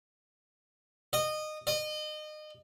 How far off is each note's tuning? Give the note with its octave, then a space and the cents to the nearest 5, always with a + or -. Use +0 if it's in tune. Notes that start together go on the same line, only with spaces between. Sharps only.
D#5 -20
D#5 -30